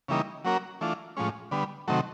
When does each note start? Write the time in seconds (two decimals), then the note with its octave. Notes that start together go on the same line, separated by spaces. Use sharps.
0.08 C#3 E3 G3 A#3 D#4
0.44 F#3 A#3 C#4 F#4 A#4
0.81 E3 A3 D4 F4
1.16 A2 F3 G#3 C#4
1.51 D3 G3 B3
1.88 C3 D#3 F#3 A3